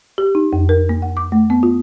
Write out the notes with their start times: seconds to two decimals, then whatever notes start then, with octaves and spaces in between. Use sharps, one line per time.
0.18 G4
0.35 D#4
0.53 F2
0.69 A#4
0.89 A#3
1.02 F#5
1.17 D6
1.32 A3
1.50 B3
1.63 F4